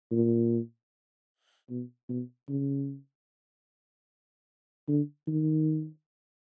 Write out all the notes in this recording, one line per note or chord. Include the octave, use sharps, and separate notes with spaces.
A#2
B2
B2
C#3
D3
D#3